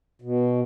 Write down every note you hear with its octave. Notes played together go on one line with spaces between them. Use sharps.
B2